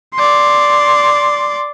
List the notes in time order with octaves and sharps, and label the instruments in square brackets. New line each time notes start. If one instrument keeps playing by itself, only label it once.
[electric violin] D5 C6